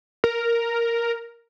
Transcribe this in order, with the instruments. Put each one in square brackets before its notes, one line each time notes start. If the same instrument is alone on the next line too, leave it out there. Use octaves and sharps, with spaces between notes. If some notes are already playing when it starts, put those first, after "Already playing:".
[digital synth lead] A#4